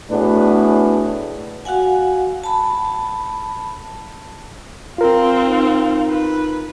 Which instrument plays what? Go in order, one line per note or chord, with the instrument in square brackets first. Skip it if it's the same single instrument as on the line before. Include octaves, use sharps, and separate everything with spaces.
[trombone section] A2 B3 D4 F#4 G#4 B4
[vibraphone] F#4 F5 F#5 G#5
A5 B5
[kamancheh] C4 F5 [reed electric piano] F4 A#4
[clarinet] D#4
[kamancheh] B4